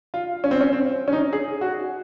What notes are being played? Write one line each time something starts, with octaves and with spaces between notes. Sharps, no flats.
F4
C#4
C4
C#4
C4
C#4
D#4
G#4
F#4